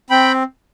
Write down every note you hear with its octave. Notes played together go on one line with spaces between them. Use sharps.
C4 G5 B5